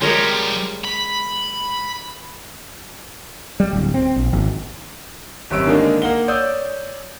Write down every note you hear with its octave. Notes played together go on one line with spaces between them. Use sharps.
F3 G3 G#3 A#4 C#5
B5
G3
D1
C4
A#1
G#1
G#1 F#2 G3 C#6 E6 D7
D3 D#3 G#3 A#3 D4 D#4
A#3 F#5 G7
C#5 D5 D#6 E6 G6